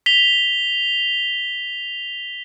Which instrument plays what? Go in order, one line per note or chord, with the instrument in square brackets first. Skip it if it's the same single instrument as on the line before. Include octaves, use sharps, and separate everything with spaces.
[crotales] B6 F7 G7